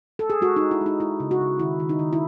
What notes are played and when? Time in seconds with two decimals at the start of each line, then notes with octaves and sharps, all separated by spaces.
0.19 A4
0.30 G#4
0.41 G#3 F#4
0.56 D#4
0.62 G#3
0.71 E4
0.81 G#3
0.86 D#4
1.00 G#3 E4
1.20 C#3
1.31 F#4
1.41 C#3
1.59 D#3 E4
1.80 D#3
1.89 D#4
1.99 D#3
2.13 E4